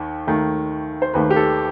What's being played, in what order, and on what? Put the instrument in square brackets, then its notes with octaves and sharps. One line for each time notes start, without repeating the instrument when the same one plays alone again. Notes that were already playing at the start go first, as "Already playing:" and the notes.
Already playing: [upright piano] D#2 D#3
D#2 D#3 A3
C5
D#2 D#3 A3 B4
G4
A4